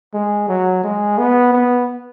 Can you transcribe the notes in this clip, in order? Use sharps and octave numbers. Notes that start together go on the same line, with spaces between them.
G#3
F#3
G#3
B3
B3